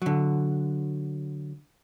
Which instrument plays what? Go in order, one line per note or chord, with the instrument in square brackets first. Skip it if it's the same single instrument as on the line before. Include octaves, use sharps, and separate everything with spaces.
[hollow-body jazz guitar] D3 F#3